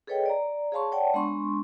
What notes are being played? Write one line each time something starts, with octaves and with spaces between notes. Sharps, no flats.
G#4 A4 B4 C#5 D#5 G5
D5 A#5
G#4 C#5 F5 A5 C6 C#6
C#5 D5 F#5 G5 A5
G#3 B3 D4 C6 C#6